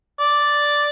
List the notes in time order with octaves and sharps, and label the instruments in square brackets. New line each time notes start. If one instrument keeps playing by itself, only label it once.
[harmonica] D5